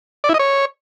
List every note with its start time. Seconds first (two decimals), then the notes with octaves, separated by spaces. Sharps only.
0.24 D5
0.29 E4
0.34 D#5
0.39 C#5